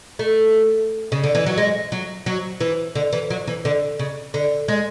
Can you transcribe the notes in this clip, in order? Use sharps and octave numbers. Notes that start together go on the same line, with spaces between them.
A3
C#3
D3
E3
F#3
G#3
F#3
F#3
E3
D3
E3
F#3
E3
D3
C#3
D3
G#3